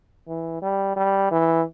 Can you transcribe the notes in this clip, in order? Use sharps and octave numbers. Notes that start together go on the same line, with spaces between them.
E3
G3
G3
E3